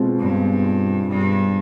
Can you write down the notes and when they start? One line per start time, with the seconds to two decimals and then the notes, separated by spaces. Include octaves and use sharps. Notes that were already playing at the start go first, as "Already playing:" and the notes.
Already playing: B2 G#3 C4 F4
0.19 G2
1.08 G2